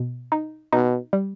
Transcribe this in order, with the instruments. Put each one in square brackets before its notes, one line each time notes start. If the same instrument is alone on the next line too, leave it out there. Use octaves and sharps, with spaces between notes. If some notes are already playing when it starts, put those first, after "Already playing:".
Already playing: [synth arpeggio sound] B2
D#4
[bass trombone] B2 [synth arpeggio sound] D#4
[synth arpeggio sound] G3